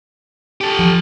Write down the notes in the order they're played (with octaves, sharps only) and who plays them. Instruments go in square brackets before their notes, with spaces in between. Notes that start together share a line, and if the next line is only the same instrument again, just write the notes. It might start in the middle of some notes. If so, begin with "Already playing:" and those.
[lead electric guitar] G4 A4
[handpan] F3